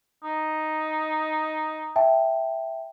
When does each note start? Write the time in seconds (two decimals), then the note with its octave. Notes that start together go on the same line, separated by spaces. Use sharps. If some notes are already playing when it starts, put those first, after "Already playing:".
0.24 D#4
1.96 E5 G5 A5